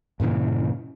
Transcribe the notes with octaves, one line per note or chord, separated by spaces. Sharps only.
G2 A#2 C#3 E3